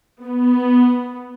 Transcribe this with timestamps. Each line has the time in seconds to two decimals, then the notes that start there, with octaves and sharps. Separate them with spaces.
0.22 B3